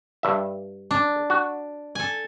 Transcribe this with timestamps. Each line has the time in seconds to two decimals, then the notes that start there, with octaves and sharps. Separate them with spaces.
0.23 G2 E5
0.91 D4
1.30 F#4
1.95 A4 G#5